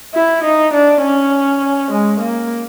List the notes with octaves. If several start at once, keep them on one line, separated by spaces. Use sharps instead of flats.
E4
D#4
D4
C#4
G#3
A#3